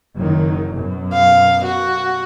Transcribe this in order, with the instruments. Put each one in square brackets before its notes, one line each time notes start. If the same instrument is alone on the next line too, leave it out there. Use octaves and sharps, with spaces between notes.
[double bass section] F#1 D#3 F#3
F#2 B2
[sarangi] F5
F#4